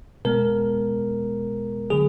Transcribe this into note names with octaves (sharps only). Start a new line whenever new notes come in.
B2 G#3 B3 A#4
D3 F#3 G#4